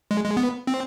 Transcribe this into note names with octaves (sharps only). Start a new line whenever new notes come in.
G#3
G#3
B3
C4